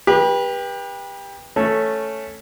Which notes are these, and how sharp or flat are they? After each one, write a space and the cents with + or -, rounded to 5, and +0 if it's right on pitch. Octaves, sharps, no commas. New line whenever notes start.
G4 +25 B4 -30
A3 +0 C#4 +0